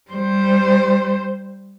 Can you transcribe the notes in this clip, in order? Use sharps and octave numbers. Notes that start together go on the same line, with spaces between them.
G3 C5